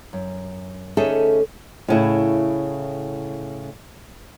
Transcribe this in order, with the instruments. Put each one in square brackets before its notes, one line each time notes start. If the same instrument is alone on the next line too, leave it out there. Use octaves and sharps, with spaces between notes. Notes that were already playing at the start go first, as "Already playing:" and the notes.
[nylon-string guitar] F#2
D2 C#4 D#4 G#4 A4 E5
A2 C#3 E4